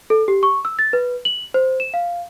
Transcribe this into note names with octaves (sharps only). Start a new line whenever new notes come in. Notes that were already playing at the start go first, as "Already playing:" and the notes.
A4
G4
C#6
E6
A6
B4
F#7
C5
E7
F5